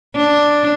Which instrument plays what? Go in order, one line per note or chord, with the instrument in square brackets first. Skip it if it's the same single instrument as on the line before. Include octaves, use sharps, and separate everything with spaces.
[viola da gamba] D4